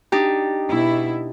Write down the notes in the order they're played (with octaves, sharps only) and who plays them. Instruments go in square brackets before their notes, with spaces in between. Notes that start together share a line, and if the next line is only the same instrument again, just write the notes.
[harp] D4 D#4 G4
[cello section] B2 E4